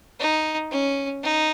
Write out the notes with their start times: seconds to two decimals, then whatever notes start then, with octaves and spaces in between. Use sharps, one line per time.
0.20 D#4
0.71 C#4
1.23 D#4